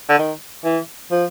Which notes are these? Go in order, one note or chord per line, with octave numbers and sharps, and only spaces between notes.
D3
D#3
E3
F3